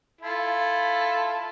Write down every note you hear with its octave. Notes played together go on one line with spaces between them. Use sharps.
E4 F4 A4